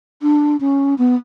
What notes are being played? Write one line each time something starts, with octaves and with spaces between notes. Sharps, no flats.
D4
C#4
B3